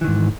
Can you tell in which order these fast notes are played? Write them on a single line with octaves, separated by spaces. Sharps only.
E3 D#3 G#2